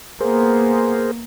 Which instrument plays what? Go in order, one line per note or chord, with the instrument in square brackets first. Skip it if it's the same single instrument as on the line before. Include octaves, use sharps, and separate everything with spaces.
[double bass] A#3 B3 [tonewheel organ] G#4 A#4 C5